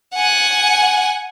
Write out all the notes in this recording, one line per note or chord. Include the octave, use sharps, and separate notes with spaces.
F#5 G#5